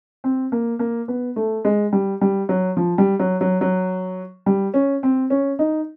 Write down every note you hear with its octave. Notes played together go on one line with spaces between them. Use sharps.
C4
A#3
A#3
B3
A3
G#3
G3
G3
F#3
F3
G3
F#3
F#3
F#3
G3
C#4
C4
C#4
D#4